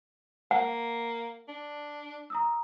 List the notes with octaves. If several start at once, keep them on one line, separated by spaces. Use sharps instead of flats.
A#3 F#5
D4
A#5 D#6 E6